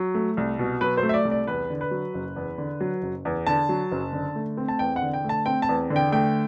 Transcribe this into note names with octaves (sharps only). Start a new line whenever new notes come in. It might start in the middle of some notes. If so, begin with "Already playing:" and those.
Already playing: F#3
A3
C2
B2
F#3 B4
C5
A3
E5
D5
C2
D5
E2 B4
D3
B4
F#3
F#1
E2
D3
F#3
F#1
E2
D3 A5
F#3
F#1
D3
A3
C4
A5
E2 G5
F#5
D3
G5
A3 A5
C4 G5
A5
E2
D3
G5
A3 G5